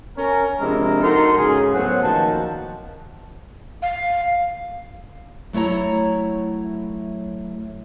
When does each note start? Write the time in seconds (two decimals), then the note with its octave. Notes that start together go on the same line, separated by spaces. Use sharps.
0.17 C#4 A#4
0.59 C3 F3 G#3 D4 E4 A#4
1.02 D#4 F#4 A4 A#4 C6
1.37 G#2 C#3 G#4
1.72 F#2 A2 F#3 B3 C5 F#5
2.03 A#2 D#3 F3 F#4 A5
3.82 F5
5.53 F#3 A3 E4 C#5 A#5